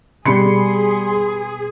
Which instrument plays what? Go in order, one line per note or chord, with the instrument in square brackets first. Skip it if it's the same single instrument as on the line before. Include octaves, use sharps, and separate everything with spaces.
[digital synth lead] B2 [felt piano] G3 B5 C#7 [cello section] G#4 [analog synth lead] C6